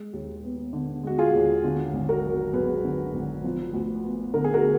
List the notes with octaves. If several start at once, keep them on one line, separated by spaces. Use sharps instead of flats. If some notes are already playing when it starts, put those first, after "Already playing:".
Already playing: G#3
D#2
B3
D3
G#3 F#4
F4 G#4
D#2
D3
G#1
F#4 A#4
F#3
F#2 G#4 B4
D3
G#1
F3
D2
B3
D3 A#4
G#4
F#4 A#4